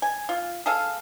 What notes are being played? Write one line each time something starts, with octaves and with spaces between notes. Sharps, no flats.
G#5
F4
G#4 A4 F5